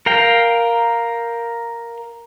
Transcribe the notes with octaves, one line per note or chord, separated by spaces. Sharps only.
A#4 F5 G5